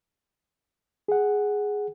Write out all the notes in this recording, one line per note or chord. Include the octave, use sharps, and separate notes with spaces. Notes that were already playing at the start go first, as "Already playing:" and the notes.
G#4 F#5